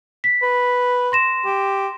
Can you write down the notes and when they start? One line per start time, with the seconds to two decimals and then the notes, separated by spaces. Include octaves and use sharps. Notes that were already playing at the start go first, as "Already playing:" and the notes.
0.24 B6
0.42 B4
1.12 C6 A#6 E7
1.45 G4